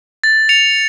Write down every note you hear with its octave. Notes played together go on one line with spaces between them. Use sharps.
A6
C#7 F7